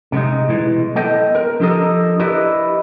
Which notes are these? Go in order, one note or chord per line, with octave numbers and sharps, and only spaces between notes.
C3 G#3 D#4
B2 E3 G#3
B3 A4 D#5 G5
A#4
F3 D4 G4 A4 A#4 D#5
E4 G4 A#4 B4 D5 D#5